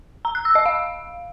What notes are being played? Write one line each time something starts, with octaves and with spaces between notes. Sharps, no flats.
A#5
F#6
E6
D#5
F5